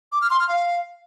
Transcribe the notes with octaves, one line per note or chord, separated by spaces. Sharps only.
D6
F6
C6
F6
F5